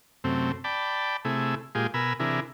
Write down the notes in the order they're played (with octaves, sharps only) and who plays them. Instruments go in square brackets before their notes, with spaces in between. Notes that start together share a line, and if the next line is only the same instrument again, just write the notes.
[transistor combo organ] F#2 C3 A3 C4
D5 G5 A5 B5
C3 A3 E4 G#4
A#2 G#3 F4 G4 G#4
B2 A#4 G#5 B5 E6
C3 E3 D4 E4 G#4 A#4